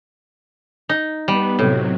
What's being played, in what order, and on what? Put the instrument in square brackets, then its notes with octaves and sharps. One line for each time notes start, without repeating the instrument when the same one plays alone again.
[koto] D#4
[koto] G3 [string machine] B3
[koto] A2 [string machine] C3 F#3